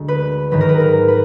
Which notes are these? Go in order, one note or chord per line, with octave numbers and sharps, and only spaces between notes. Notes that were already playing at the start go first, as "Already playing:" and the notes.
Already playing: D2 D3 G#3
B4
G#2 D#3 F#3 B4
A#4
B4
A#4
B4